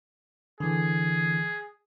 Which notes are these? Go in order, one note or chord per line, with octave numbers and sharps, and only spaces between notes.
D3 E3 G#4